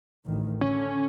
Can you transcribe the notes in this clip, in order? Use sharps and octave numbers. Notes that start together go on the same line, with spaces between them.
A1 D2 D#3
D3 C#4